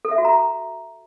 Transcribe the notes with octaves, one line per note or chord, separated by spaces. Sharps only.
A4
E5
F#4
A#5